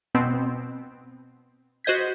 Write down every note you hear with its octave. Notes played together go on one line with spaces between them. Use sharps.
B2 B3 C4
F#4 C5 D#5 G6 G#6 B6